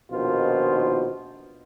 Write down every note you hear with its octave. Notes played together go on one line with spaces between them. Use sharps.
A#1 D#2 B2 D#3 F4 C5